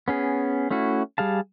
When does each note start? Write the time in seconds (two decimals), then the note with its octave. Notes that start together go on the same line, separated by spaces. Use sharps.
0.08 B3 C#4 G#4
0.71 A3 C#4 E4 F#4
1.18 G3 G#4 F5 A5